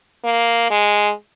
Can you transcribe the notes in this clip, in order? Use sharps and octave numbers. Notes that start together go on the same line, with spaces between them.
A#3
G#3